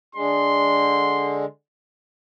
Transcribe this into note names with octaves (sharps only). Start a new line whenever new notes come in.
D3 G#3 C6